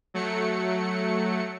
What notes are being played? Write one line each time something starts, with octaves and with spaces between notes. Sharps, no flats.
F#3 A3 C#7